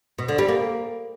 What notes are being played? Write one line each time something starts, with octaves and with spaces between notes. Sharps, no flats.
B2
D3
G3
A#3